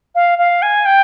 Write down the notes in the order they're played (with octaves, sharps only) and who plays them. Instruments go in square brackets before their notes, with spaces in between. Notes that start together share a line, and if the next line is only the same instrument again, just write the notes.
[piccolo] F5
F5
G#5
G5